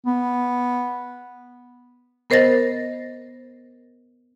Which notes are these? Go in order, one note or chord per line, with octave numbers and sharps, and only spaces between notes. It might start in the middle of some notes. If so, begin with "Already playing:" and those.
B3
B3 A#4 C5 D#5 A6 A#6